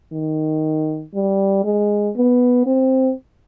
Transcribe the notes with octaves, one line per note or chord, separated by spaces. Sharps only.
D#3
G3
G#3
B3
C4